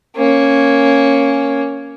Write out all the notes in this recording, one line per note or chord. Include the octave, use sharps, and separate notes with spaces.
A#3 C#4